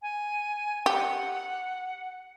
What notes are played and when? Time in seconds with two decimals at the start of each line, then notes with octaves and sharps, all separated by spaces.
0.02 G#5
0.86 G4 F#5